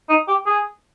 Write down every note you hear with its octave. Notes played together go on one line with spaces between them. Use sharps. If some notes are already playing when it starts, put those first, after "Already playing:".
D#4
G4
G#4